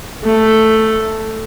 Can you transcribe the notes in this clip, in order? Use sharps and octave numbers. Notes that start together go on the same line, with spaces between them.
A3